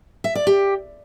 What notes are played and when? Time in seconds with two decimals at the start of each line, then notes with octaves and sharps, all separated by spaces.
0.24 E5
0.35 D5
0.47 G4